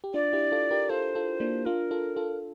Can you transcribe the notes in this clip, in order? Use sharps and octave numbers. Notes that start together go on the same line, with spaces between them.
G4
D4 F4 D5
E4 G4
F4 A4
G4 A#4
F4 A4 C5
F4 A4
A#3 D4
D4 F4 A#4
F4 A4
F4 A4